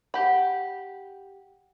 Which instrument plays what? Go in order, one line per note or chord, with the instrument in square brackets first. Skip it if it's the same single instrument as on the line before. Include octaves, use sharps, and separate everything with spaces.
[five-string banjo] G4 B5 [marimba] F#5